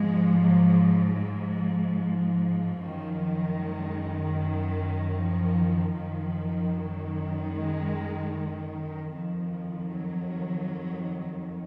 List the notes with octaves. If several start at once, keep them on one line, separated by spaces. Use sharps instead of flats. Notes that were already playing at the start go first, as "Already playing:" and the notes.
Already playing: G#2 F3 G#3
F#3
F#3
F3
F#2 D#3
G#3
F#3
F3
F#2 D#3 F3
F#3
G#3
F2 D#3 F3
F#3